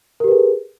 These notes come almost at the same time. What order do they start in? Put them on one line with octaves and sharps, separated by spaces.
A#4 G4 B4 G#4